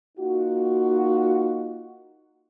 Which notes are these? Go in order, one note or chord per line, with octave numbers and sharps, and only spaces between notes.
A#3 D#4 F4 F#4